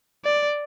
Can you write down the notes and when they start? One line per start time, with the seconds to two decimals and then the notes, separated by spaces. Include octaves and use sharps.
0.25 D5